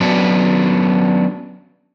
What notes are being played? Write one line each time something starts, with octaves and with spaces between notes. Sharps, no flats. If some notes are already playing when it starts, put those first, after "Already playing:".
F#3 B3 C#4 D4